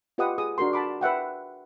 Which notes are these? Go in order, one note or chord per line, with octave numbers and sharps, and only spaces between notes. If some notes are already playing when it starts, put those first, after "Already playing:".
F4 G4 B4 D#5 F#5 D#6
G#4 D#6
D4 F#4 A#4 C6
A5 B5 D6
B4 E5 F#5 G5